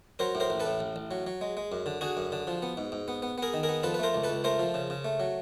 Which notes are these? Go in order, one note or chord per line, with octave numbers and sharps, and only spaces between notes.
F#3 A#4 C5
A2
A#4 C5
A1
A4 B4
A2
A1
A1
F#3
F#3
G#3
G#3
F#2
D3
D3 F#4 G#4
F#2
D3
F3
B3
G#2
G#2
B3
B3
B3 G#4 A#4
D#3
G#4 A#4
B3
F3 A4 B4
B4
A3 A#4 C5
C#2
A4 B4
C#2
A3 A#4 C5
F3
C#3
C#3
A3
F#3